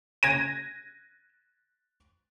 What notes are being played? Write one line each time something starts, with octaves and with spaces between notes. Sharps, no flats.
G#6 A#6 D#7